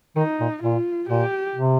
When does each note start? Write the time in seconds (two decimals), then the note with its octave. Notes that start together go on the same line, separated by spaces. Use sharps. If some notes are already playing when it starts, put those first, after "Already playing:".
0.16 D#3 D#4
0.40 A#2
0.63 A#2 F4
1.09 A#2 G4
1.55 C3